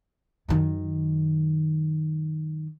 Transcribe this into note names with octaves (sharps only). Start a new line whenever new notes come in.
F#2 D#3